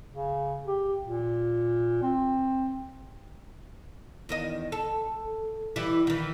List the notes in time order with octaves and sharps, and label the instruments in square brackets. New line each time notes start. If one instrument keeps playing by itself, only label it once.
[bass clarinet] C#3
G4
A#2
C4
[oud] E2 D#3 D#5
A4
E3 G3 E4
D#3 E3